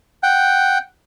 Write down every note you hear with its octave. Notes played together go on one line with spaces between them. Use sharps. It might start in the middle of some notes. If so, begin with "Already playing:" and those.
F#5 G5